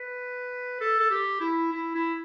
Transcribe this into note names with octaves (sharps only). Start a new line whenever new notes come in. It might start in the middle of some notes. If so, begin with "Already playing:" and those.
Already playing: B4
A4
A4
G4
E4
E4
E4